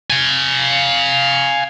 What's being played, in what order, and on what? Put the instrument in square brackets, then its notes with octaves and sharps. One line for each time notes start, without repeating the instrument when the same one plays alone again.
[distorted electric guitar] F5 G#5